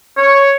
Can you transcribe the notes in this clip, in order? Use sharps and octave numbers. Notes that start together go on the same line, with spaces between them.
C#5